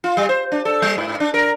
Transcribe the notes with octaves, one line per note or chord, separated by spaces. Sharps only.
F4
G3
C5
D4
A4
G3
G#2
D4
A#4